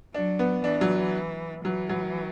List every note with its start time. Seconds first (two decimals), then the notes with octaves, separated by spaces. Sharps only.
0.14 F#3 D4
0.39 B3
0.64 E3 D4
0.81 F#3
1.65 E3 F#3
1.89 F#3